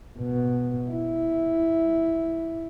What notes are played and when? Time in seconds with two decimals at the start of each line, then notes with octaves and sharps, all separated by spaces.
0.19 B2
0.90 E4